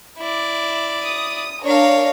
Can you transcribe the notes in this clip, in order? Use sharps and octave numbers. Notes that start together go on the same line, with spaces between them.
E4 D5
D#6
D4 A#4 C#5 F5